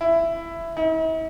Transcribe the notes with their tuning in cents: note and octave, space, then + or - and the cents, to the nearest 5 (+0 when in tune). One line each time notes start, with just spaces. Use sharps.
E4 +15
E4 -45